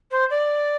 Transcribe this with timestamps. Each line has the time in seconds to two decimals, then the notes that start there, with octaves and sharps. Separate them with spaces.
0.11 C5
0.30 D5